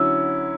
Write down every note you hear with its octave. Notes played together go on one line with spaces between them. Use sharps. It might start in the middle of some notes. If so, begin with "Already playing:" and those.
Already playing: D3 F#3 C#4 E4 E6